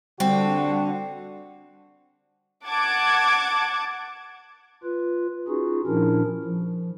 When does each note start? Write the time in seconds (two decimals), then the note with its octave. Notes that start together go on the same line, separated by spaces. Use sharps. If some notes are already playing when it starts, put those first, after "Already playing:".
0.20 D3 G3 C4 F#4
2.66 F#5 A5 D6 G#6
4.84 F4 B4
5.48 C#4 D#4 F4 F#4 G#4
5.87 A#2 F3 C#4 D4 E4 A#4
6.44 F3